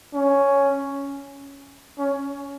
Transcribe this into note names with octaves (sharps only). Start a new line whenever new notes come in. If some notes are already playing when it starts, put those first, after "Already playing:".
C#4
C#4